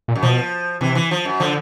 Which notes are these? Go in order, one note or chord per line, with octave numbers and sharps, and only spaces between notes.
A#2
F#2
B2 F3
C3 E3
E3
F3
F#2
D3 F3